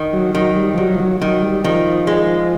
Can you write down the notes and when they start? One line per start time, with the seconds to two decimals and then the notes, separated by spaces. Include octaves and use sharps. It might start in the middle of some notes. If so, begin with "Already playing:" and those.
Already playing: D#3
0.13 F#3
0.35 D#3 F#3
0.56 G3
0.74 F3
0.77 D#3 F#3
0.95 F3
1.00 F#3
1.21 D#3 F#3
1.42 G3
1.64 D#3 F3
2.07 G#3